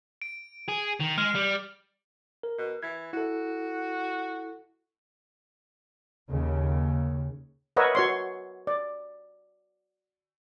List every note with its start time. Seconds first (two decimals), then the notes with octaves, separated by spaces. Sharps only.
0.22 D7
0.69 G#4
1.01 D#3
1.18 G#3 F6
1.35 G3
2.43 A#4
2.58 B2
2.83 E3 G#6
3.13 E4 F#4 A4
6.30 D#2 C#3
7.77 A#4 B4 C#5 D#5 E5 F#5
7.95 F#4 C#5 C6
8.67 D5